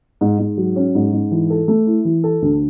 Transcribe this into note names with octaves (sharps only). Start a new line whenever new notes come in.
G#2
G#2
F#3
C#4
G#2
G#2
E3
A4
A3
E4
E3
A4
D2